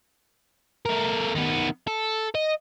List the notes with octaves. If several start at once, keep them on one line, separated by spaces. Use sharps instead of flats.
A3 A#4
D#3 B3
A4
D#5